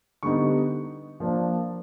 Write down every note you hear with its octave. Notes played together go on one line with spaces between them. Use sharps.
D3 G3 B3 D#4 C#6
F3 A#3 D4